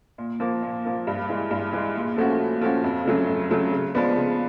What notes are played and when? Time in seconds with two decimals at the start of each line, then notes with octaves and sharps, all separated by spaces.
0.18 A#2
0.40 F3 A#3
0.63 A#2
0.85 F3 A#3
1.07 G2
1.29 E3 G#3
1.51 G2
1.73 E3 G#3
1.95 A#2
2.17 F3 A3 C#4 F#4
2.40 A#2
2.61 F3 A3 C#4 F#4
2.84 F2
3.05 C#3 F#3 A3 C#4
3.28 F2
3.49 C#3 F#3 A3 C#4
3.72 C#3
3.95 F3 G#3 B3 D4
4.16 C#3